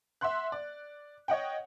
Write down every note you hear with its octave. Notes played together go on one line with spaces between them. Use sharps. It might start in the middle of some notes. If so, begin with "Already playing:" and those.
E5 F#5 C6 F#6
D5
C#5 D#5 F#5 G5